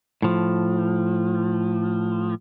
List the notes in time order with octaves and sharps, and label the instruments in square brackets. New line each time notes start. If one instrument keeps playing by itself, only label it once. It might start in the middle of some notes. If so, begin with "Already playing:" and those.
[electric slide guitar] A2 F3